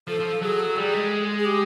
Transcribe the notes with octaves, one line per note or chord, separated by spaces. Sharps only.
F3 A4
F3
F#3 G#4
A4
G3 G#4
G#3
G#4
G4